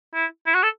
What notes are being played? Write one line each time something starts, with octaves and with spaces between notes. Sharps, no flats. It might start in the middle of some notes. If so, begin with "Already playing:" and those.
E4
E4
F#4
A4